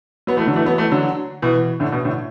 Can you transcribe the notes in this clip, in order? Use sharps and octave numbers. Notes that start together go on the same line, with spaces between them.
F#3 B3
E3 A3
D3 F#3
E3 A3
F#3 B3
E3 A3
D3 F#3
B2 E3
A2 D3
B2
A2 D3